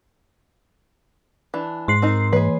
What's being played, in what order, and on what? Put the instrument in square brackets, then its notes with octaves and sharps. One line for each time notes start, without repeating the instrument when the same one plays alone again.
[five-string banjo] E3 D4
[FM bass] G#2 [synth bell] C6 C7
[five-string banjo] C4 D#4 A#4
[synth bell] E3 [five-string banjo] G#4 B4